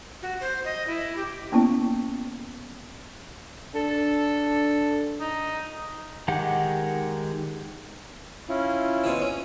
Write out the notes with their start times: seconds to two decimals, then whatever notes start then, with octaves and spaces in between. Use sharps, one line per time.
0.22 F#4
0.41 C5
0.65 D#5
0.87 E4
1.16 G4
1.52 A#3 B3 C#4 E4
3.75 D4 A4
5.20 D#4
6.28 D#3 G#3 G4 F#5
8.49 C#4 E4 F4
9.04 B2 E3 C4
9.22 C#4